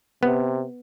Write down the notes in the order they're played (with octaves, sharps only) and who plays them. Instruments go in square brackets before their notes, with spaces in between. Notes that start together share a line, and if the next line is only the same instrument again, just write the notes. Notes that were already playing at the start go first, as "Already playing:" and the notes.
[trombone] C3 [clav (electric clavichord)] B3